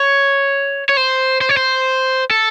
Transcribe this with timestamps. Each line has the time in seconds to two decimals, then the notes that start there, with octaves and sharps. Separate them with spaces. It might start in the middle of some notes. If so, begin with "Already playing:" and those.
Already playing: C#5
0.89 C#5
0.97 C5
1.41 C5
1.49 C#5
1.57 C5
2.31 A4